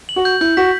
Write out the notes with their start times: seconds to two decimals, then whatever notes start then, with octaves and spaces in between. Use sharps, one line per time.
0.09 F#7
0.16 F#4
0.25 G6
0.41 E4 G6
0.57 F#4 B6